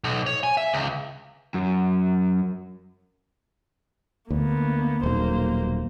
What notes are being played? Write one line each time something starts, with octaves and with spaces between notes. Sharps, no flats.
B1
C#5
G#5
E5
C#2
F#2
D2 A#3 B3
D#1 B1 A#3 C5